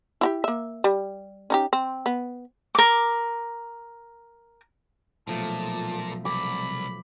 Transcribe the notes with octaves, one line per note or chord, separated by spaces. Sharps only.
E4 F#4 G4
A#3 E5
G3
C#4 D#4 G4
C4
B3
A#4 D6
B1 A#2 F3 A3 A5
C2 B5 D6